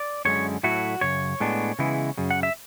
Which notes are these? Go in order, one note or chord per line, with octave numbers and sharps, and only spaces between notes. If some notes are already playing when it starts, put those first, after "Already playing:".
Already playing: D5
F#2 D3 G#3 C#4 E4 C#5
A2 F#3 A3 E4 F#4
F#2 C#3 C#5
A2 G#3 B3 D4
C#3 E3 G#3 B3 E4
F#2 C#3
F#5
E5